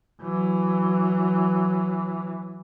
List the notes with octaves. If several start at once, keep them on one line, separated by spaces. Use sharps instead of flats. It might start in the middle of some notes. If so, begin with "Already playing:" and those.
E3 F#3